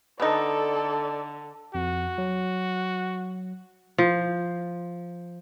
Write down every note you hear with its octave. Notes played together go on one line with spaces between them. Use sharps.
D3 B3 D#4 A4 D5
F2 F#4
F#3
F3